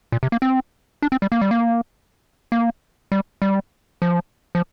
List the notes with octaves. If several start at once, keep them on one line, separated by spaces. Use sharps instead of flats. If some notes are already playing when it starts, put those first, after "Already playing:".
A#2
C3
A#3
C4
D4
C4
G3
A#3
G3
A#3
A#3
G3
G3
F3
F3